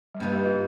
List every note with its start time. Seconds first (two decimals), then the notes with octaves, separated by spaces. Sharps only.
0.15 G3
0.20 G2 F3 A#3 D#4
0.32 G4
0.45 F4